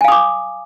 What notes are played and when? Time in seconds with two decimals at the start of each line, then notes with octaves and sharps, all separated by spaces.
0.01 G#5
0.04 F5
0.08 D#6
0.12 D6